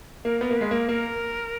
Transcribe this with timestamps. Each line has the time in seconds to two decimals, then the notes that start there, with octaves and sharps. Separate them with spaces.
0.25 A#3 A#4
0.41 B3 A#4
0.51 A#3
0.57 G#3 B4
0.71 A#3 A#4
0.89 A#3 A#4